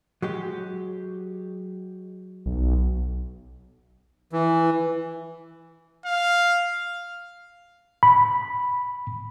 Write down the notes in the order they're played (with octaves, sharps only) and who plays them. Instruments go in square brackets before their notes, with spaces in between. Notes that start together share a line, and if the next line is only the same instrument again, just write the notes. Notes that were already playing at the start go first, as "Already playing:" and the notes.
[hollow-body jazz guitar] F#3 G#3 G4
[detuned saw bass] B1
[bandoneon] E3
[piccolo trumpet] F5
[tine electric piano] B5